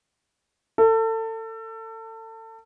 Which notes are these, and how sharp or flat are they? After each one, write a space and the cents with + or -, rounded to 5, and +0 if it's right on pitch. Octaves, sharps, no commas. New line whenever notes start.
A4 +30